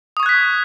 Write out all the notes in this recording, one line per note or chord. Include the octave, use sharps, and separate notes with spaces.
C#6 D#6 F#6 G#6 B6